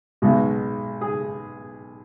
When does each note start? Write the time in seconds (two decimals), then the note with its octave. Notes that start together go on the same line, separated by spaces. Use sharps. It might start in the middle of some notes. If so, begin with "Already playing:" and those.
0.22 B1 B2 G#3 F#4
1.01 G#4